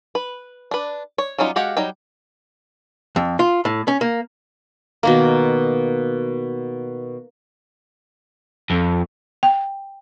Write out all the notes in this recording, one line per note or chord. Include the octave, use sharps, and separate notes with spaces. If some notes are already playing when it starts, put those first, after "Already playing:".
B4
D4 B4
C#5
F#3 G3 C#4 D#4 F4
G#3 F#4 G4 F5 F#5
F#3 G3 D#4 G5
F2
F4
A2
C#4
A#3
B2 D#3 A#3
F2
G5